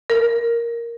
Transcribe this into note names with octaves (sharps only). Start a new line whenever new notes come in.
A#4